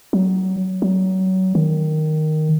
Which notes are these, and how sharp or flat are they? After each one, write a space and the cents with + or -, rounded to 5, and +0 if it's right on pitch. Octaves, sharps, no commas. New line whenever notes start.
F#3 +20
F#3 +25
D#3 -5